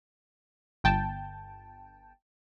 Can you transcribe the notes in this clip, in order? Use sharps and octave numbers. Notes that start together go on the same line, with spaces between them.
G1 G5 A5